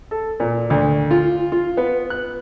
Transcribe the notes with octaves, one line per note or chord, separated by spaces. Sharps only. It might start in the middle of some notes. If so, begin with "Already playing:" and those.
A4
A#2
D2
F4
F4
B3
F#6